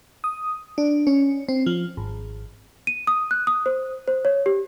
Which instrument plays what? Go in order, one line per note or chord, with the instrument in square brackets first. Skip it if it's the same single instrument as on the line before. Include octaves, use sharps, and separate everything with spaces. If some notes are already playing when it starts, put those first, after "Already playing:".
[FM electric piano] D#6
D4
C#4
C4
F3
G#1
[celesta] D#7
D#6
F#6
D#6
C5
C5
C#5
G4